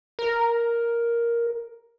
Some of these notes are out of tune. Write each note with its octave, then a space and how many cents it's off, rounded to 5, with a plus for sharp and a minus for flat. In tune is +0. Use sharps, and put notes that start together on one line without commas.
A#4 +5